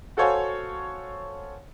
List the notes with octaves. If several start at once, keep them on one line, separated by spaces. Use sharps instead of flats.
F#4 A4 C5 C#5 F5 G#5